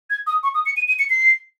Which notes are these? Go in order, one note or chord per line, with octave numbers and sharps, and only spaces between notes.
G#6
D#6
C#6
D#6
C#7
D#7
D#7
C#7
C7